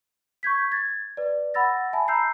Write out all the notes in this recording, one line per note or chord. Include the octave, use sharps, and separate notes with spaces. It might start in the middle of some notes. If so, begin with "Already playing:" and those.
C#6 G6 G#6 B6
G#6 A6
B4 D5
F#5 B5 E6 A6 A#6
E5 G#5 A5 B5
A#5 B5 E6 G6 C7